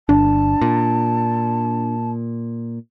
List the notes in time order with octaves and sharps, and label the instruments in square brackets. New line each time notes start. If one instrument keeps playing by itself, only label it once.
[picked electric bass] G1 [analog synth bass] D4 [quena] A5
[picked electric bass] A#2